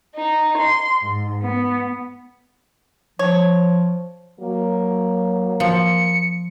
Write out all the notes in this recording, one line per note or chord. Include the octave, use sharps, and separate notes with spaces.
D#4
C6
G#2
B3
F3 C#5
F#3 A#3
F3 C#7